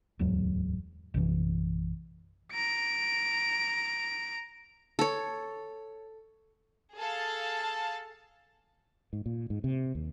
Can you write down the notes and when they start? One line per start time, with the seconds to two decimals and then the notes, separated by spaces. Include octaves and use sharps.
0.19 D1 E2 G#2 F#3
1.14 A#1 F#2 C3 E3
2.53 A#5 D7
4.99 A4 C#5
6.96 G#4 A4 F5 A5
9.13 G#2
9.26 A#2
9.50 G#2
9.64 C3
9.95 D#2